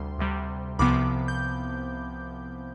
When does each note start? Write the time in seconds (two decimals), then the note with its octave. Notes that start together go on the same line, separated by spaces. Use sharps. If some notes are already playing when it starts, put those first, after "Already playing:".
Already playing: D2 C3 G3 C6
0.18 D2 C3 G3
0.79 C2 C3 F3 B3 B5 D6
1.28 G6